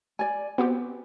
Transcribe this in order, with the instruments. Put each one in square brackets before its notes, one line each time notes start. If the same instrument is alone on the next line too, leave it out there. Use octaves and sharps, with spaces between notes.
[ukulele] D5 G#5
[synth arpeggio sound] B3 C4 G4 [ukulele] F#4